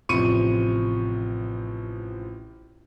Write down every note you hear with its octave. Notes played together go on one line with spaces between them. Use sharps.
A1 C3 F3 C#6 C#7 D#7